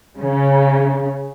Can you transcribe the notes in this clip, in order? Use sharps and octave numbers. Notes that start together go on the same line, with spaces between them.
C#3